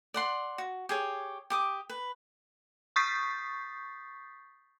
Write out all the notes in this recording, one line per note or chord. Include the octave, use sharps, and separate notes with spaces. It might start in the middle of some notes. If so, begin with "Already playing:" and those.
D5 F#5 C6
F#4
G4 G#4 C#5
G4 D6 D#6
B4
C#6 D#6 G6 A6 B6 C7